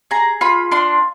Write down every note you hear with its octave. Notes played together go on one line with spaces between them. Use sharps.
G#4 A#5
F4 B5
D4 C6